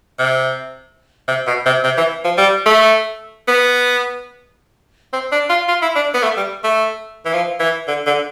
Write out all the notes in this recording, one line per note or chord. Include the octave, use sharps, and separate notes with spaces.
C3
C3
B2
C3
C3
E3
F3
G3
A3
B3
C4
D4
F4
F4
E4
D4
B3
A3
G3
A3
E3
F3
E3
D3
D3